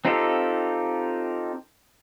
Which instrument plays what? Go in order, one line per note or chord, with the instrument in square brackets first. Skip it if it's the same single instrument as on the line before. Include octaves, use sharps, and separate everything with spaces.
[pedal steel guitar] C4 D#4 F4 G4 A4